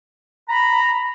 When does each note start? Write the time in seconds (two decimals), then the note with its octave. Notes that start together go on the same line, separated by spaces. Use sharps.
0.49 A#5 B5